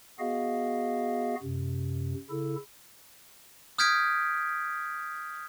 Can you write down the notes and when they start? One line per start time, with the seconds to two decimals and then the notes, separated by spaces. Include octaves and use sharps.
0.19 B3 F#4 G#4 D#5 F5
1.42 F#2 C3
2.30 C#3 E4 A4
3.78 D#6 F6 G6 G#6 B6 D7